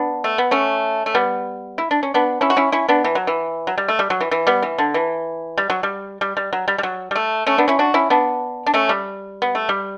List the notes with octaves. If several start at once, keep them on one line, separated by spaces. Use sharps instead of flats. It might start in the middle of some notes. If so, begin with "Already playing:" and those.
Already playing: B3 D4
A3
B3
A3 C#4
A3
G3 B3
E4
D4
C#4
B3 D4
C#4 E4
F#4
C#4 E4
C#4 E4
B3 D4
E3
F#3
E3
F#3
G3
A3
G3
F#3
E3
E3
G3 B3
E3
D3
E3
G3
F#3
G3
G3
G3
F#3
G3
G3
F#3
G3
A3
A3 C#4
B3 D4
C#4 E4
D4 F#4
C#4 E4
B3 D4
D4
A3 C#4
G3
B3
A3
G3